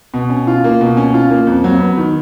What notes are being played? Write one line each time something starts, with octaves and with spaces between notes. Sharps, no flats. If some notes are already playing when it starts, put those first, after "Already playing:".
B2
C#4
F4
A#3
B2
C#4
F4
A#3
F2
F#3
B3
D#3